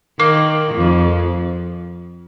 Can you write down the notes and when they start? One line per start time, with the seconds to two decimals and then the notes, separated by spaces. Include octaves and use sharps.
0.19 D#3 A#3
0.75 F2